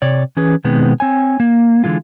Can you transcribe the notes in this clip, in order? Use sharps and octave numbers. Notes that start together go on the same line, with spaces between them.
C3 C#5 D5
E3 C#4 G#4 B4
B2 D#3 G#3 B3 C4
C4 C#5 G#5
A#3
D3 E3 G#3 F4